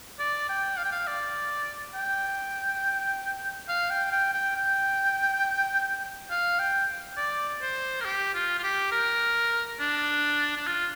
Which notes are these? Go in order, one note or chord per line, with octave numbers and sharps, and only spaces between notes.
D5
G5
F5
G5
F5
D5
G5
F5
G5
G5
G5
G5
F5
G5
D5
C5
A#4
G4
F4
F4
G4
A#4
D4
D4
F4